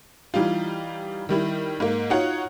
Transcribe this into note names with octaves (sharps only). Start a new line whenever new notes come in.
E3 G3 D#4 F4
D#3 G3 E4
G#2 A#3
D#4 F4 F#4 C#5 F#5